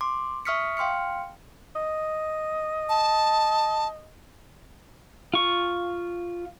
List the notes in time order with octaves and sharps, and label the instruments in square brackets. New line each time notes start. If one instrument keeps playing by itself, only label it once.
[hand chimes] C6 D6
E5 C#6 D#6 F6 B6 C#7
F5 G5 C6 F6 C#7
[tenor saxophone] D#5
[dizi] A5
[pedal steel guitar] F4 C#6